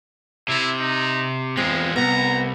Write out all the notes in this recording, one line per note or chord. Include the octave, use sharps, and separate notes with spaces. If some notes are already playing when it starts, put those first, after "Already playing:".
C3 E4
D#4
E2 F3 G#3 C4
C2 B3 A#5